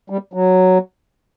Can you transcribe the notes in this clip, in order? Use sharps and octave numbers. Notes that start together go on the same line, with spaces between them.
G3
F#3